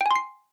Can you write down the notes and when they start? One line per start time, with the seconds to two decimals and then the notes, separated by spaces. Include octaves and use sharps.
0.01 G5
0.06 G#5
0.11 C6
0.16 C7